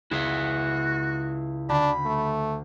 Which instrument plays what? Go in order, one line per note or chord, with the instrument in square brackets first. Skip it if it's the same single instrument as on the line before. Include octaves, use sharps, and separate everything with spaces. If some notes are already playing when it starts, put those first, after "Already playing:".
[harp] C#2 [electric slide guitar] E4 G#4 E5 [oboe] F#4
[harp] D2 D3 [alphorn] D4 [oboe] B5
[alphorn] A3